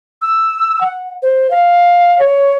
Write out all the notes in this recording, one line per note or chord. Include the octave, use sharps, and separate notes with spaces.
E6
F#5
C5
F5
C#5